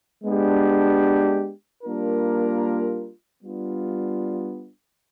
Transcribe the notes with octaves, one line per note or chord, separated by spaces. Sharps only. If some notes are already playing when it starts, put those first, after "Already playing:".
G#3 B3 D4 G4
G3 A#3 D4 F4 A#4
G3 B3 D4 F4